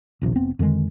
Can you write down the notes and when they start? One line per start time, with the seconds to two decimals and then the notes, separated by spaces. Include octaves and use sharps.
0.21 D#1 A#1 D#2 C3
0.36 F1 B3 C4
0.59 F2 D3 D#3 G#3